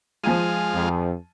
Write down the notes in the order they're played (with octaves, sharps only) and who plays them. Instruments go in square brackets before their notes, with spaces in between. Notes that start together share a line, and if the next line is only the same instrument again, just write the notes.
[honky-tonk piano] F3 G#5 D#7 [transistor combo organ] G#3 F4
[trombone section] F2